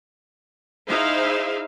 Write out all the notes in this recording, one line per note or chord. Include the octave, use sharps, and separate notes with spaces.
D#4 E4 G#4 C5 E5 F5